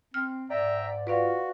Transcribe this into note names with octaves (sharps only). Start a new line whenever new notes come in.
C4 F6
G#2 D5 E5 G5 A#5
F4 F#4 B4 D5 F5